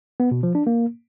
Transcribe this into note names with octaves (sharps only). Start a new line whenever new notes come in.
B3
B2
F3
D4
A#3